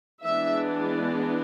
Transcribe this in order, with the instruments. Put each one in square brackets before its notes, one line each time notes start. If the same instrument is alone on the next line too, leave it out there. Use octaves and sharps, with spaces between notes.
[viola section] E3 G#3 B3 D4 E5